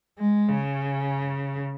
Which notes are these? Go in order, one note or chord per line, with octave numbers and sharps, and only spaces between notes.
G#3
C#3